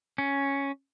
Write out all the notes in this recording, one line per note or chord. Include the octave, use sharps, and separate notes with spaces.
C#4